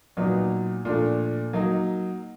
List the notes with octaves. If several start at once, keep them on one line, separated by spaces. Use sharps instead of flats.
A#2 F#3 B3 D#4
A#2 F3 A3 D4
F#3 A#3 D#4